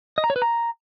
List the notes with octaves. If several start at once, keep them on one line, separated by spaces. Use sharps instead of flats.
D#5
A#5
C#5
B4
A#5